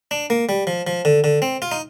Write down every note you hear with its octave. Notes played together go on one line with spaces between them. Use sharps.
D4
A#3
G3
F3
F3
D3
D3
C4
F4
D#4